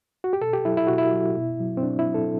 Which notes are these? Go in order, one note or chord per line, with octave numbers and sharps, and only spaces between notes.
F#4
G4
B2 A4
G4
F#3 E4
E4
B2 F#4
E4
F#3
B2
F#3
C4
B2 D4
E4
F#3
A4